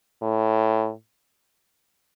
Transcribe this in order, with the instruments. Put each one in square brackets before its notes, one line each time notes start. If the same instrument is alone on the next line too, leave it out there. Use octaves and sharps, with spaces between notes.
[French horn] A2